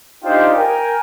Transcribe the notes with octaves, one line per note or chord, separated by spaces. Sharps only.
D4 D#4 F4 G4 C5 G5
A#4 G5 G#5